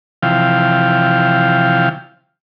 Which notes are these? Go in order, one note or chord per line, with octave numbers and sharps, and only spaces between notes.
C3 E3 F3 F5 G5